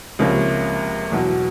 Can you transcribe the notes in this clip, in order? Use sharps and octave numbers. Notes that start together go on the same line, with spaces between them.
C#2 C3 F3 A#3 C#4
E2 B2 F#3